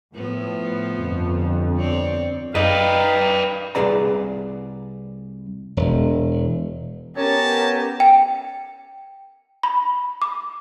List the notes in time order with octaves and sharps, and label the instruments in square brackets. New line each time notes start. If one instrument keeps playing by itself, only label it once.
[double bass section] A2 [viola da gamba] F3 B3
[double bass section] G1 F2
[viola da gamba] C4 C#5 D5
[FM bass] F#2 [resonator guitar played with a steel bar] D#4 [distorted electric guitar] B4 D5 [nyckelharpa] F5 G5
[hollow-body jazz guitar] C2 G#2 G#4 B4 D5 A#5
[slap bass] E1
[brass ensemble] B3 C#4 [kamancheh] G4 A#4 [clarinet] C#5 [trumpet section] D#5 G#5 A5
[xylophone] G5
B5
D6